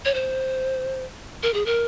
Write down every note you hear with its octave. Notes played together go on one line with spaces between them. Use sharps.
C#5
C5
A#4
G#4
A#4